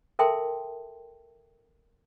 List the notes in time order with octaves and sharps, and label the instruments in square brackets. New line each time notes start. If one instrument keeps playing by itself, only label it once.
[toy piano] A4 A#4 E5 G5 A5 C6